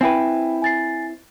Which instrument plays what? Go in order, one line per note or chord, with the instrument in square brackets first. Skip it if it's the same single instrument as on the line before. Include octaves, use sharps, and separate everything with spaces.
[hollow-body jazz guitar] C4 E4 B4 [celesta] G5 G#5
[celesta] G#5 A6 C7